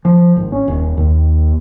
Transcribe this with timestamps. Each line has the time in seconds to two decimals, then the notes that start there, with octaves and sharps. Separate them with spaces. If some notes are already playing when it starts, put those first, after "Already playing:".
0.05 F3
0.36 G#1
0.52 C#4
0.68 D#1
0.97 D#2